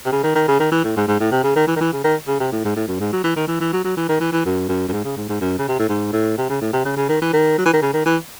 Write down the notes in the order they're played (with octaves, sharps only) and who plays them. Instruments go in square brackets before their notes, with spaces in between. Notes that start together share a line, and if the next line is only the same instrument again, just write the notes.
[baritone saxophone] C3
C#3
D#3
D#3
C#3
D#3
E3
A2
G#2
G#2
A2
C3
C#3
D#3
E3
D#3
E3
C#3
D#3
C#3
C3
A2
G#2
A2
F#2
G#2
F#3
E3
D#3
E3
E3
F#3
F#3
E3
D#3
E3
E3
F#2
F#2
F#2
G#2
C#3
G#2
G#2
F#2
C#3
C3
A2
G#2
A2
C3
C#3
A2
C3
C#3
C#3
D#3
E3
D#3
F#3
E3
D#3
C#3
D#3
E3